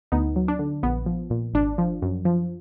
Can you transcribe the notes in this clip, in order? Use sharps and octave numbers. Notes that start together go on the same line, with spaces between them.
D2 B3 D#4
F#3
D4
D3
A#1 B3
F3
A#2
G#1 D4
F3
F#2
F3